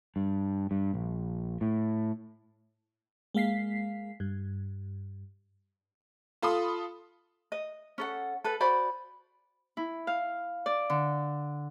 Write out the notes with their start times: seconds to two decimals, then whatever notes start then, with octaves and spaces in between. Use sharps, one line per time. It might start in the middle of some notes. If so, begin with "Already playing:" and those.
0.16 G2
0.71 G2
0.94 A#1
1.61 A2
3.35 G#3 A#3 F5 B6 C7
4.20 G2
6.42 F4 A4 B5 C6 D#6
7.52 D#5
7.98 C#4 A4 F#5
8.44 A4 B4
8.60 F#4 C5 D5 B5
9.77 E4
10.07 F5
10.66 D5
10.90 D3